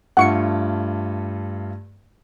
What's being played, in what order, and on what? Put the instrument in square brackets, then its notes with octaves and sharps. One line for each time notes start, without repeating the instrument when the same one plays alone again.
[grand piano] G2 A3 F4 [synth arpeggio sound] F#5 C#6 C#7